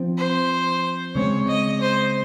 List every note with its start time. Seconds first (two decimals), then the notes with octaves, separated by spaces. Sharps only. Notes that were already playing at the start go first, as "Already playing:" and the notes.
Already playing: F3 C4
0.18 C5
1.15 C#3 G#3 C4 C#5
1.48 D#5
1.81 C5